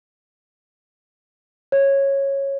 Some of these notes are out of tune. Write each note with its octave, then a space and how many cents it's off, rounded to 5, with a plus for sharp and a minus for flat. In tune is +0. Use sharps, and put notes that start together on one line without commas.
C#5 -10